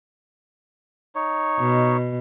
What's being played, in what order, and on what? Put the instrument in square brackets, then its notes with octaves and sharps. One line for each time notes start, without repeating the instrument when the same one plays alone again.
[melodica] D#4 C#5
[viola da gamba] B2